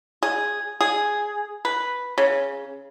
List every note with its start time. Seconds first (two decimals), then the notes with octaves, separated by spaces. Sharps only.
0.23 G#4
0.81 G#4
1.65 B4
2.18 C#3